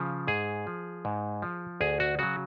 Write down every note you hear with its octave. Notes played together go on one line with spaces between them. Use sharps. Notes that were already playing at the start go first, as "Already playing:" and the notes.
Already playing: C#3 F3
G#2 G#4
F3
G#2
F3
D2 G#4
F#4
C#3 F#3 F#4